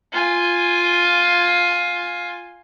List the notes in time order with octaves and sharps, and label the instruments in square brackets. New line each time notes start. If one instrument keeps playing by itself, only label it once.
[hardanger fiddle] F4 G#5